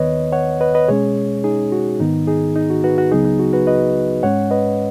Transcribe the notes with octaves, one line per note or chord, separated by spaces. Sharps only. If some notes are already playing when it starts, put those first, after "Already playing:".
Already playing: D#2 D#3 B3 B4 C#5 D#5
C#5 F#5
B4 D#5
B4 D#5
B2 G#3 C#4 G#4 C#5
D#4 G#4
F#4
G#2 D#3 B3 D#4
D#4 G#4
D#4
F#4
F#4 B4
F#4
C#2 C#3 F#3 B3 D#4 G#4
D#4
F#4
F#4 B4
B4 D#5
G#2 G#3 C#4 C#5 F#5
B4 D#5